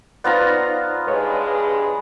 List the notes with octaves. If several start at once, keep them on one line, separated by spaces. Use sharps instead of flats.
B3 D#4 F4 C5 D5 A#5
G2 G#3 B4 C#5 D#5